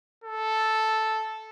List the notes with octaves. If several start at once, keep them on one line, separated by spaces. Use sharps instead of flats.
A4